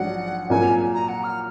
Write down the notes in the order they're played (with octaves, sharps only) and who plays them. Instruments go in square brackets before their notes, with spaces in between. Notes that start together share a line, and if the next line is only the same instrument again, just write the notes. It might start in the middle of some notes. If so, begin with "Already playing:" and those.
Already playing: [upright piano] A#1 G#2 F#3 D4 [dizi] F#5
[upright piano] A#2 F#3 A#3 [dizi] G#5
[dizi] A#5
F#5
F6